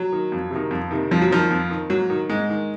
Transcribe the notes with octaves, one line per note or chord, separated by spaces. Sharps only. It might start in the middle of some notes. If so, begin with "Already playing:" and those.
Already playing: F#3
D#3
F2
C3 D#3
F2
C3 D#3
F2 F3
F#3
D#3 F3
F2
D#3
G#2 F#3
D#3
G#2 G#3
D#3